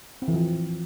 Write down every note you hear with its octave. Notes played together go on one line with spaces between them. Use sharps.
C4
E3
F3